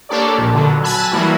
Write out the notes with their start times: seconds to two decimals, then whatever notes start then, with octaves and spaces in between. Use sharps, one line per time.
0.09 A#3 D4 G4 A4 C#5 D5
0.38 A#1 A#2
0.54 B2 D3 F#3
0.83 G#5 A5 B5 E6 F#6 G#6
1.11 E3 F#3 G3 A#3 E4 F#4